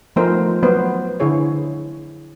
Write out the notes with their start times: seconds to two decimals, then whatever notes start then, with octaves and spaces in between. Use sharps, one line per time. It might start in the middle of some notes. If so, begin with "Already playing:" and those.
0.16 F3 A3 B3 D#4 A#4 C5
0.63 F#3 B3 B4 C5
1.20 D3 E4 G#4 C#5